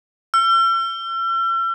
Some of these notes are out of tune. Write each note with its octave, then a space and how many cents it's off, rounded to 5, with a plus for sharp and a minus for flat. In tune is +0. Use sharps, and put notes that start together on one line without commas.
E6 +45